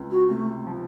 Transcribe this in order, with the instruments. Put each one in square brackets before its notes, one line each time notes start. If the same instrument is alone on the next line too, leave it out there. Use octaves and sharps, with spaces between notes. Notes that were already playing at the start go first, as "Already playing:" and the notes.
Already playing: [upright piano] C#2 C4
[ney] F#4
[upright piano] C3 [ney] A3
[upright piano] F3